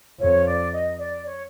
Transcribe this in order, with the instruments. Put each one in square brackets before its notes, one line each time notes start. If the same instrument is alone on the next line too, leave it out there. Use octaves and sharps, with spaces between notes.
[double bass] F2 [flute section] C#5
[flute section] D5
D#5
D5
C#5